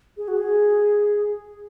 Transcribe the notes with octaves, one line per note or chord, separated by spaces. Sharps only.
G#4
F#4
G#4